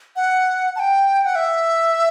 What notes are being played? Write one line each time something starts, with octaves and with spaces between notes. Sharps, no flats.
F#5
A5
G5
F#5
E5